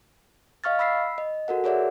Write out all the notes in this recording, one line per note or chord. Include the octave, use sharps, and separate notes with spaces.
D#5 F5 C#6 F6 A6
B5 E6 B6 C7
D#5
F#4 A4 A#4 F#5
G#4 A#4 C#5 D5 E5 F#5